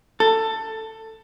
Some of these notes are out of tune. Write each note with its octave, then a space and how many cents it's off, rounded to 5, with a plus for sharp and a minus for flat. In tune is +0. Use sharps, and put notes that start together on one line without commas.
A4 +15